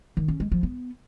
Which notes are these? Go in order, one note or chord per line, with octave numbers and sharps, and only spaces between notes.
D#3
C#4
G#3
F3
B3